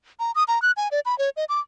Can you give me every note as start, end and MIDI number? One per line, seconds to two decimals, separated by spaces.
0.20 0.32 82
0.35 0.44 87
0.48 0.61 82
0.62 0.72 90
0.77 0.88 80
0.91 1.00 74
1.06 1.17 83
1.18 1.30 73
1.37 1.45 75
1.49 1.60 86